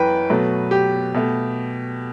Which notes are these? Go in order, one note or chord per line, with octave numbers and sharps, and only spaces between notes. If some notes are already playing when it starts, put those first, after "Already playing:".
Already playing: F#2 E3 B4 G5
B2 F#3 A3
G4
B2 A3